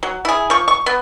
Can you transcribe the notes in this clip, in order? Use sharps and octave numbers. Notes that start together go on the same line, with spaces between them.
F#3
E4 G#4
F3 C#6
C#6
B3